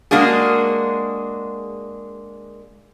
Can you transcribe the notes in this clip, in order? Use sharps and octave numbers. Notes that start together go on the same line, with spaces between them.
G#3 A#3 D4 F#4 G#4